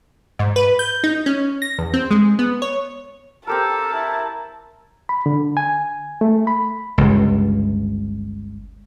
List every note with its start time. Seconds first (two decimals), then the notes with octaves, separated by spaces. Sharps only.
0.39 G#2
0.56 B4
0.79 G6
1.04 D#4
1.26 C#4
1.62 A#6
1.78 E2
1.94 C4
2.11 G#3
2.39 B3
2.62 C#5
3.47 C4 G4 A4 A#4 A5
3.94 E4
5.09 B5
5.26 D3
5.57 G#5
6.21 A3
6.47 B5
6.98 G1 C#2